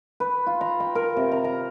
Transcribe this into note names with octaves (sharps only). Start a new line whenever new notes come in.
B4
F4
A#5
G5
A#4
C3
A#5
A#5